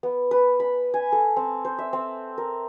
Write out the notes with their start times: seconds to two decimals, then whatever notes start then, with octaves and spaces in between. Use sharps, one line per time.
0.03 B3
0.31 B4
0.60 B5
0.94 G#5
1.12 A4
1.36 C4
1.65 C5
1.78 E5
1.93 C4
2.38 A#4